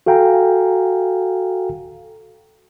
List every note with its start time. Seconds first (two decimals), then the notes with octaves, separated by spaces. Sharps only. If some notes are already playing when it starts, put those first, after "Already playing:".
0.06 F#4 A4 F5 G5 G#5 A#5